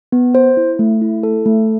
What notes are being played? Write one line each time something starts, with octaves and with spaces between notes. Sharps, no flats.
B3
C5
E4
A3
E4
A4
A3